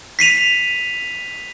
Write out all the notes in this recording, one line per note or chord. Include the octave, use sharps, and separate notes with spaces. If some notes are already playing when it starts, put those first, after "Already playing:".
B6 C7 D#7 F7